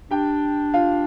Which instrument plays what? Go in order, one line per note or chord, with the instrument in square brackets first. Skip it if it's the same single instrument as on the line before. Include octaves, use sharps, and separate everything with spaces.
[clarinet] D4 [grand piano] G4 G5
[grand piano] F4 F5